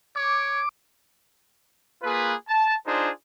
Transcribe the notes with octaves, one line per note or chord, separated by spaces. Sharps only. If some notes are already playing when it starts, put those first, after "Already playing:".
C#5 D6
A#3 F4 G#4 B4
A5
D4 D#4 F4 G#4 C5